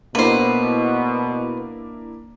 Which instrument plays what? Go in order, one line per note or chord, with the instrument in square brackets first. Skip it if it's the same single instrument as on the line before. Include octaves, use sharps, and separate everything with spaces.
[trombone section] B2 [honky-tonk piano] A#3 D4 E4 [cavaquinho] B4 C5